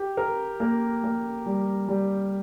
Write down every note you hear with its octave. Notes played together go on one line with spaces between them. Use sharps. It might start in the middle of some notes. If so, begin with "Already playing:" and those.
Already playing: G4
A#4
A#3
A#3
G3
G3